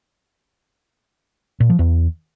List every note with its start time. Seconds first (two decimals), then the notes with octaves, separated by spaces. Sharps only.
1.60 A#2
1.70 F3
1.79 E2